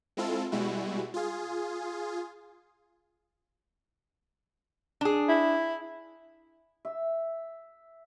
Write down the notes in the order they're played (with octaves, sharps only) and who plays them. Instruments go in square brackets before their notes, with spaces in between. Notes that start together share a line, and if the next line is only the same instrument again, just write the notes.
[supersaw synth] G#3 C4 E4 F4 A4
B2 G3 G#3 E4 F#4
F4 G#4
[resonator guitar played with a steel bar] D4 G#4
[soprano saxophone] E4
[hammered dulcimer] E5